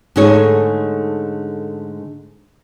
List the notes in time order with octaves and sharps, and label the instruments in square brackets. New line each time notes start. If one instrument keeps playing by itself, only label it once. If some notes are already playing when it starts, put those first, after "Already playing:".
[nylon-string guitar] G#2 D3 A3 D#4 G#4 C#5